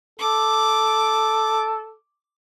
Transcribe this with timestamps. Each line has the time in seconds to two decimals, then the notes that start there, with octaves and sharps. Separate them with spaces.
0.19 A4 D6